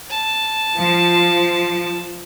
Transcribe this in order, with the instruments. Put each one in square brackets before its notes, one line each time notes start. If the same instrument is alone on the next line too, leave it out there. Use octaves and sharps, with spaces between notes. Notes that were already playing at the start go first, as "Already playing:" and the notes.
[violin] A5
[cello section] F3